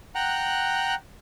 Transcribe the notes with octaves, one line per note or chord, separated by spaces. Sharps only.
F#5 G5 A#5 F#6